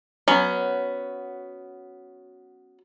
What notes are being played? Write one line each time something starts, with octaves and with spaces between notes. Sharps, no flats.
F#3 B3 C#4